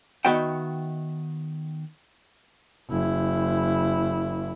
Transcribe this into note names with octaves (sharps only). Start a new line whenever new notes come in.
D#3 B3 F#4 E5 F#5 G5
F#1 E4